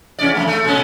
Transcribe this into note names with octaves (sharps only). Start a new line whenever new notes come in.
E2 C#4 D5
F2 D#3 A3
A3
A#2 C#4